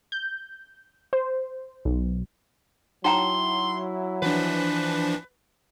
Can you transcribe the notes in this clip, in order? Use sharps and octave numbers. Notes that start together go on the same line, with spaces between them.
G6
C5
B1
F#3 D#4 E4 G5 A#5 C6
E3 F3 D4 B4